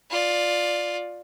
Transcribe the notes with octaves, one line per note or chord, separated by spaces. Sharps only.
F4 D5